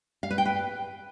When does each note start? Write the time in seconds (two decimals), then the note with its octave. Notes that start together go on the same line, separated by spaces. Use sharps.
0.23 F5
0.31 B4
0.38 G5
0.45 B4